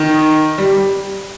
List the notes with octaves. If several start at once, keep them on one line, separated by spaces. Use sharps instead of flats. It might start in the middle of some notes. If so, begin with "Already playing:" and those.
Already playing: D#3
G3